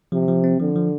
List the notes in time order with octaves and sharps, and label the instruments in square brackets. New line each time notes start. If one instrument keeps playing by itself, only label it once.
[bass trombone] C3 [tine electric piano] F3
[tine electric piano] F3
C4
[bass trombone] D3 [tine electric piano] F3
[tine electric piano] F3